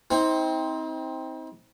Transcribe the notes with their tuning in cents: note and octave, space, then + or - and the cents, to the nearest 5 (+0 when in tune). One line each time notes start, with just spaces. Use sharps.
C4 +0 D#4 +40